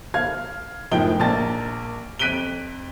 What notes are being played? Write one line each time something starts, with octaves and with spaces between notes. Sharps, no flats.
F5 F6 G#6
F#1 A2 F3 D#4 G5 G7
A#1 A#3 A5 A6
F2 F#6 B6 D7 D#7 G7